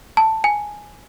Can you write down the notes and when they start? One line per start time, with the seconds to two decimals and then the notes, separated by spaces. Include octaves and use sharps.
0.17 A5
0.44 G#5